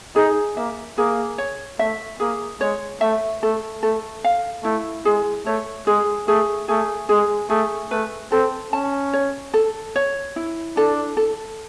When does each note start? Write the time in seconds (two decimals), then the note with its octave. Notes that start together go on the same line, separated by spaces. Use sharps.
0.16 D#4 G#4
0.57 A#3 E5
0.98 A#3 G#4
1.38 C#5
1.79 A3 E5
2.20 A#3 G#4
2.61 G#3 C#5
3.01 A3 E5
3.43 A3 A4
3.83 A3 A4
4.24 F5
4.64 A3 E4
5.05 G#3 G#4
5.46 A3 C#5
5.87 G#3 G#4
6.28 A3 G#4
6.68 A3 G#4
7.09 G#3 G#4
7.50 A3 G#4
7.91 A3 B4
8.31 C4 A4
8.72 C#4 A5
9.13 C#5
9.54 A4
9.96 C#5
10.36 E4
10.77 D4 A4
11.17 A4